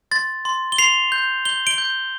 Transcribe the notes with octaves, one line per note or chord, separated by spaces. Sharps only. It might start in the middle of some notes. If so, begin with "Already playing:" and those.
C6 A6
C6
G7
C6 C7 F7
G6
G6 G7
D7 G7
G6